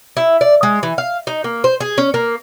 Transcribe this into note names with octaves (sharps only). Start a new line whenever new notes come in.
E4
D5
G#3
E3
F5
D#4
A#3
C5
G#4
C#4
A#3